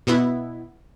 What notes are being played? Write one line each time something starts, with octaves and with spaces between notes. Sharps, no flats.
B2 B3 E4